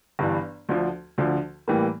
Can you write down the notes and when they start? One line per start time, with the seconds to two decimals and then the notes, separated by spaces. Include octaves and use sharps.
0.19 G1 G2 E3
0.69 D2 D3 F3
1.18 D2 D3 F3
1.68 A2 E3 G3 A#3